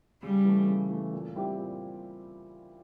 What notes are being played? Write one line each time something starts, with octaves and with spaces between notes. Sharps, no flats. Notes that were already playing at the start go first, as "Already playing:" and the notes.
C#3 G3
E3 A3
C#3
E3 A3
A#2
G3 C4 E4 G4
A#2